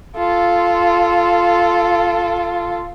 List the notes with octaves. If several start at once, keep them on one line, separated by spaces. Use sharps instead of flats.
F4 A4